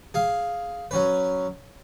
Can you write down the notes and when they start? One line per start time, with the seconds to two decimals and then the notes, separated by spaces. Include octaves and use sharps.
0.14 G#4 F5
0.91 F#3 C#4 B4